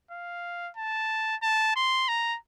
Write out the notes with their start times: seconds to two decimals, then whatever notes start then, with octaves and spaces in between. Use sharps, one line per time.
0.11 F5
0.77 A5
1.42 A5
1.76 C6
2.08 A#5